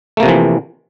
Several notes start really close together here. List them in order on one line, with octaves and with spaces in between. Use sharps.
A3 A#3 C3 F3 E3